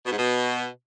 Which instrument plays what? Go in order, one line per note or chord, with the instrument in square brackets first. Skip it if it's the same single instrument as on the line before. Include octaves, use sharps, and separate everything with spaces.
[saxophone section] B2
G#2
B2